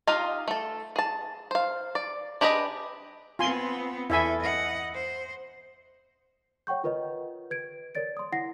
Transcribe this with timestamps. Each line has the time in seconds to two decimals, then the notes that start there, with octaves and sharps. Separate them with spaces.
0.07 D#4 F4 G4 D#5 F5
0.48 A3 A4
0.96 G#4 A5
1.51 C5 F5
1.95 D5
2.41 D4 G4 G#4 B4 D#5
3.39 B3 C4 F4 G#5 C6
4.10 E2 E4 A4 E5 G#5
4.41 D#5 F#5
4.94 C5
6.67 C#5 F#5 G5 C#6 G6
6.84 F4 A#4 B4 C#5 D#5
7.51 B4 G#6 D7
7.95 A#4 C#5 D5 A6 D7
8.17 C6 D#6
8.32 E4 F#5 A#6 C7